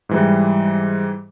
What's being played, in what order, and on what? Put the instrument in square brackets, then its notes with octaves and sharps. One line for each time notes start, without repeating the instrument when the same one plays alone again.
[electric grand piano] G#2 E3 G3